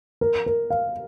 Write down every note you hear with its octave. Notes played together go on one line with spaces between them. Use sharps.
A#4
A#4
F5